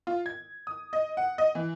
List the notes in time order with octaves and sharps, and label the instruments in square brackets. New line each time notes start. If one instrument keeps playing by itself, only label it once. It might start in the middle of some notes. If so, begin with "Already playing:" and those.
[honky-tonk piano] F4
G#6
D#6
D#5
F#5
D#5
E3